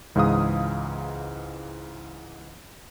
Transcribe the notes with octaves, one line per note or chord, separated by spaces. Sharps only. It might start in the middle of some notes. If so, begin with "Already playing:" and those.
C#2 G#2 E3 G#4 F5 D#6